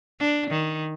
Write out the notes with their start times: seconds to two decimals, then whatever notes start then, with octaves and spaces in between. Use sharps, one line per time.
0.20 D4
0.51 D#3